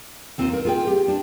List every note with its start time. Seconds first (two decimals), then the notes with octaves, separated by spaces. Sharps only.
0.38 D#2 C4 D#4 F4
0.53 A#4
0.65 F4 G#4 G5
0.87 G4
1.08 D4